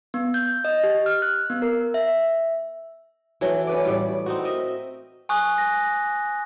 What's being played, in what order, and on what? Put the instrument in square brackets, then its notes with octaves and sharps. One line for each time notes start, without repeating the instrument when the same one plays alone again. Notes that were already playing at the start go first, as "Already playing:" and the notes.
[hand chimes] B3
G6
D#5
G4
F6
F#6
B3
A#4
E5
[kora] E3 F#3 A3
C#4 B4 D5
A2 G3 D5
C4 D#4 F#4
A#4 D#5 E5
[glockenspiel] G#5 C#6 D#6 F#6
A#6